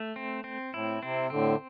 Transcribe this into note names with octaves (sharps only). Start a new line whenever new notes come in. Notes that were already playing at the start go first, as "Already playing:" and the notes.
Already playing: A3
C4
C4
A2 E4
C3 C4
A2 D3 C4